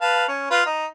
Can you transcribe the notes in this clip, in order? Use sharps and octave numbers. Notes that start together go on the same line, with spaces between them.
B4 F5 A5
C#4
F4 B4
D#4